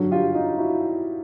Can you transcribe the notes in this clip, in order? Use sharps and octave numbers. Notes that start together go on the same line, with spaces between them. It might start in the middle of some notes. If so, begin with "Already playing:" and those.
Already playing: G2 D3 F#3
F4 G4
D#4 F4
E4 F#4